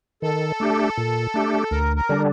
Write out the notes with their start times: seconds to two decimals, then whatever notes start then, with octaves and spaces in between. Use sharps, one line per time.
0.22 D#3 A4
0.60 A3 D4 G4
0.97 A#2
1.34 A3 D4 G4
1.71 D2 A#4
1.96 A#4
2.09 D3 G3 D4